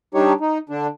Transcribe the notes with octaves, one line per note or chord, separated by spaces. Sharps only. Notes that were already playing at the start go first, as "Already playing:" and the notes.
G3 D4 D#4 G4 C#5
D#4
D3 D4